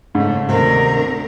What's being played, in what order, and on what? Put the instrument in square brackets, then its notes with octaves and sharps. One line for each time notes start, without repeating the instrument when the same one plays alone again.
[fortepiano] G#2 [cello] C#3 A3
[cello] D2 A#4 [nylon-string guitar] C3 D#3 C4